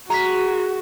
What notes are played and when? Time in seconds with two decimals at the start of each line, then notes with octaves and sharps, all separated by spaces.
0.10 G#3 F#4 A#5 B6